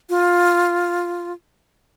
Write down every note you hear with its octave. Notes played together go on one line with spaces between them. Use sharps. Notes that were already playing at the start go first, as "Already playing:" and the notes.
F4